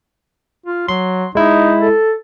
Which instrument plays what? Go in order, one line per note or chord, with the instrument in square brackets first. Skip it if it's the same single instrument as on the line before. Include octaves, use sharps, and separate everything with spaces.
[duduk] F4
[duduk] F#3 [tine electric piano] C6
[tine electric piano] G#3 E4 [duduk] D#4
[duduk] A4